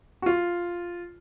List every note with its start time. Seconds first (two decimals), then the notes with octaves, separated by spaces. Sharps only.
0.22 F#4
0.26 F4